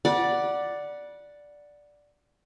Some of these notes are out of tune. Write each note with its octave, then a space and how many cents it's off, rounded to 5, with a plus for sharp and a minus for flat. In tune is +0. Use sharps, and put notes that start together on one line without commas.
D5 +0 F#5 +0 B5 -35